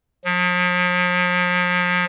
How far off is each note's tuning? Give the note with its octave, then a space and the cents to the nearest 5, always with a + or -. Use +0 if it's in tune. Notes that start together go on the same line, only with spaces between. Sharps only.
F3 +40